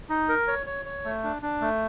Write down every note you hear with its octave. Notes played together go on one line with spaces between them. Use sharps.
D#4
A#4
C#5
C#5
C#5
A3
D4
D4
A3